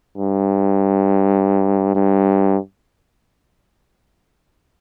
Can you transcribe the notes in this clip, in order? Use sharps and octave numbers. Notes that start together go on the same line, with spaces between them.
G2
G2